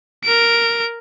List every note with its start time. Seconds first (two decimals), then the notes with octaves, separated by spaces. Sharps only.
0.24 A#4 D7